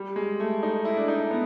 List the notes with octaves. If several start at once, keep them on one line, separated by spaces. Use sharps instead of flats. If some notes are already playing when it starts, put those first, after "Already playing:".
Already playing: G3
G#3
A3
D#4
E4
D4
D#4
B3